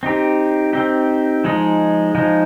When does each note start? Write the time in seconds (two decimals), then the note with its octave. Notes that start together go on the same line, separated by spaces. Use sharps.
0.03 C4 D#4 G4
0.73 C4 D#4 G4
1.44 F3 G#3 D#4
2.15 F3 G#3 D#4